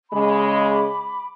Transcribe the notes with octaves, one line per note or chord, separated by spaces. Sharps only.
C#3 G#3 B5 D6